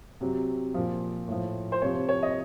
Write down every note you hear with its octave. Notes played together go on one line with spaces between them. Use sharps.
C3 F#3
A#2 F3
A2 F3
C5
C3 F3 C#5
C#5
D#5